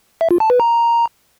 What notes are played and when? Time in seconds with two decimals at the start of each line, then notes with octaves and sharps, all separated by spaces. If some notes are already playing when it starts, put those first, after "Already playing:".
0.21 E5
0.31 F4
0.40 A5
0.50 B4
0.60 A#5